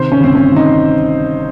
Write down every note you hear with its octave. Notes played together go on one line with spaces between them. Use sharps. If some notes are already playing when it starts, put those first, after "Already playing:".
Already playing: C3 D#3 C5
C#4
G1 C4
C#4
D#3
D#4